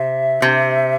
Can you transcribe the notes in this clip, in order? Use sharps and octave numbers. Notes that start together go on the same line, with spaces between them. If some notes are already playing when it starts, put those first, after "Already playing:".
Already playing: C3 E5
C3